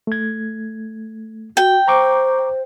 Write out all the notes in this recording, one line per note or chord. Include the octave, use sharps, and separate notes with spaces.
A3 G#6
F#4 G5
C5 A#5 C#6 D6